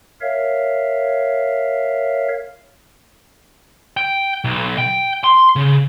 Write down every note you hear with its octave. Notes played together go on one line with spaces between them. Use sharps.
A#4 C#5 E5 F5
G5
B1
G5
C6
C#3